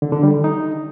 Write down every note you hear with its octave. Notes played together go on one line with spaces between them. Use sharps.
D3
D3
G3
D#3
D#4